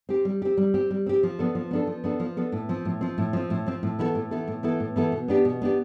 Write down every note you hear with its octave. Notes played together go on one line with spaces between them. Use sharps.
C4 G4
G3
C4 G4
G3
C4 G4
G3
C4 G4
F3
B3 D4 A4
F3
B3 D4 A4
F3
B3 D4 A4
F3
B3 D4 A4
A2
F3 C4
A2
F3 C4
A2
F3 C4
A2
F3 C4
A2
E3 B3 E4 A4
A2
E3 B3 E4 A4
A2
E3 B3 E4 A4
A2
E3 B3 E4 A4
B2
B3 D4 G4
B2
B3 D4 G4